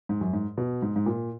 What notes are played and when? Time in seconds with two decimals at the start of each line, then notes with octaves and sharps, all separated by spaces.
0.09 G#2
0.21 F#2
0.33 G#2
0.57 B2
0.82 G#2
0.96 G#2
1.06 A#2